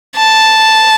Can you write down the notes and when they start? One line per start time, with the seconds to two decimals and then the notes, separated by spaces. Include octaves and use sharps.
0.16 A5